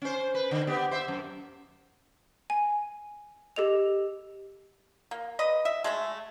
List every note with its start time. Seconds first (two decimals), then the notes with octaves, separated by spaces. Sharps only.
0.02 C#4 C5
0.34 B4
0.51 D3
0.67 B3 G4
0.91 C5 E5
1.08 F#2
2.50 G#5
3.56 G4 A4 D#5 F7
5.11 A#3
5.39 B4 D#5
5.65 E5
5.84 G#3 A3 E5